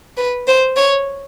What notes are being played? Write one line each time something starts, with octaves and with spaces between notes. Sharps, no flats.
B4
C5
C#5